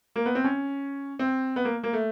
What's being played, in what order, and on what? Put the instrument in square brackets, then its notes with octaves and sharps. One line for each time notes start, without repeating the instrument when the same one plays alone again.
[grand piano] A#3
B3
C4
C#4
C4
B3
A#3
A#3
A3